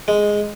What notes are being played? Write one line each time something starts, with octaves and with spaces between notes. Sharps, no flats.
G#3